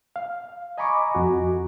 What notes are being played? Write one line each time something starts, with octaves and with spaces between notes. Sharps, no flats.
F5
D#5 G#5 A#5 B5 C#6 D6
F2 F#4